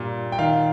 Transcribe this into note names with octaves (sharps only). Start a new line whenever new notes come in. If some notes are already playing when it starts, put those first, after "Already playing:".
Already playing: G2 A#2 G3
G5
D#3 F5